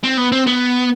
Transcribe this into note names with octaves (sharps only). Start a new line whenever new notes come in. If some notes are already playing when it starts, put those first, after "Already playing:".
C4
B3
C4
B3